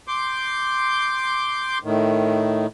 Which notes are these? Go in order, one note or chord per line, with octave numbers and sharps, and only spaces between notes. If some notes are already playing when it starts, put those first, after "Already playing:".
C6 D6 G6
A2 D#3